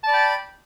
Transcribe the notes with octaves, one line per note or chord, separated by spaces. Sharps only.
D5 G5 A5 B5